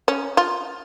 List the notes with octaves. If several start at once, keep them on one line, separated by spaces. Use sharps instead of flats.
C#4
F4